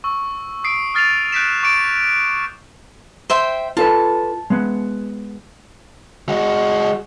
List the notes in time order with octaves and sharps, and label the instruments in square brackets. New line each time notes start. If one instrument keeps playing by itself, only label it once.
[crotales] C#6 E6
D#6 C7 D7
D#6 F6 A6 C7 D#7 F7
F#6 G6 A6 B6 D7 E7
C#6 D6 C7 D7
[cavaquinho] C5 E5 G5
[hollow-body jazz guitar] F4 A4 B4 [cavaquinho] A5
[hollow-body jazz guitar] G#3 B3
[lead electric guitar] G#3 F#4